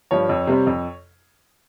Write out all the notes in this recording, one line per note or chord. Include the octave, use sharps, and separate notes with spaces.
G2 F3 C#5
F2
C3 G3 C4
F2